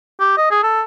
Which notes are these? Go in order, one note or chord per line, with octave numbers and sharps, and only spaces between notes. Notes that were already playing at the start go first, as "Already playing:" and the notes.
G4
D#5
G#4
A4